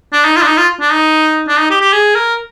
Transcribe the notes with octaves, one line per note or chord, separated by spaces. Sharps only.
D4
D#4
F4
D4
D#4
F4
D4
D#4
D4
D#4
G4
G4
G#4
A#4